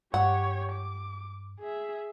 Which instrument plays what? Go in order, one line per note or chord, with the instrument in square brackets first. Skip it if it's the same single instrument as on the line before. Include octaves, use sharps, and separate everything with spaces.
[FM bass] G2 [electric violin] G4 C#5 [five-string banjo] F#5
[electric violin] D6
G#4 E5